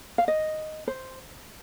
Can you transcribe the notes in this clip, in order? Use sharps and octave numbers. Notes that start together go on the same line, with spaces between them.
F5
D#5
C5